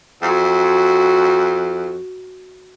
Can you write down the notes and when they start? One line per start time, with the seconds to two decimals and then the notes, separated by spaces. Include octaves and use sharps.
0.23 F2 F#4